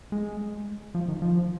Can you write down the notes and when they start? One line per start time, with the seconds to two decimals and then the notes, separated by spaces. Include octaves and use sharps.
0.12 G#3
0.95 F3
1.08 D#3
1.22 F3